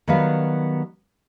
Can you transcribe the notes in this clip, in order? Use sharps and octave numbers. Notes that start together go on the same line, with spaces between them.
D#3 F#3 G3 B3 B4 F5